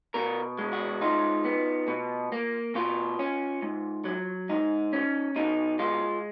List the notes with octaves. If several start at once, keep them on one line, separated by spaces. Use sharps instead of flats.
B2 A#4
G#3
F#4
D#4 F4
B3
B2
A#3
B2 F4
C#4
G#2
F#3
G#2 D#4
C#4
B2 D#4
G#3 F4